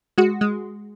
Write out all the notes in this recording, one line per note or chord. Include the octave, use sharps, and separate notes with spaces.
G#3 F#4
G#3